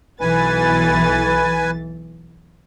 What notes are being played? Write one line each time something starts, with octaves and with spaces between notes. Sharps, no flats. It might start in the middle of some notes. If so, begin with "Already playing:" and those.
B1 E3 B4 G#5 A6